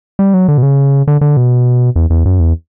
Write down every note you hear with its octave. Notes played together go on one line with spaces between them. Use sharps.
G3
F#3
D3
B2
C#3
D3
D3
B2
E2
E2
F#2
E2